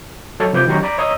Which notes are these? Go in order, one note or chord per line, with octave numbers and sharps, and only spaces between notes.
F#3 A4 C#5
C3 F3 B4 D6 G6
D#3 F#3 C#4 G4 A#5 C#6
D5 A#5 B5 D6
C#5 D#5 A#5 D#6 E6